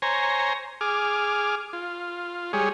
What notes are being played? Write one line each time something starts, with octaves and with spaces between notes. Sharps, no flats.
C5 C#5 G#5 A#5
G#4 D6 F6
F4
G3 G#3 G#4 C#5